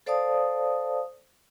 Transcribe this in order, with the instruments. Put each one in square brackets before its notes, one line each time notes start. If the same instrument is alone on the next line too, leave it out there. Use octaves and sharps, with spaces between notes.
[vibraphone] A4 C5 D5 F5 A5 D#6